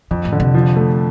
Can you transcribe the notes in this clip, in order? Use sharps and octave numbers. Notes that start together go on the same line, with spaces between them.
F2 D3
A2
D3
C3
F3
A3